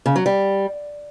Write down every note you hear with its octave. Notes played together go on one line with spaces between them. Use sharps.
C#3
F#3
G3